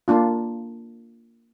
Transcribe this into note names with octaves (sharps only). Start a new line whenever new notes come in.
A#3 D4 F4